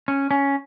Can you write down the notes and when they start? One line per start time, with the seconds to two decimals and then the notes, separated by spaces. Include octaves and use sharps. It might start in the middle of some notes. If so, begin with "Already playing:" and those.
0.08 C#4
0.31 C#4